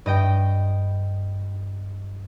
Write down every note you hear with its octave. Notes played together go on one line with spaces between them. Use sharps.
G2 D#5 G5